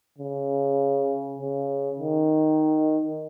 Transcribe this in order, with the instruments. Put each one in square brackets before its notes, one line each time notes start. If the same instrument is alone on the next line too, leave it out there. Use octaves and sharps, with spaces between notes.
[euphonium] C#3
C#3
D#3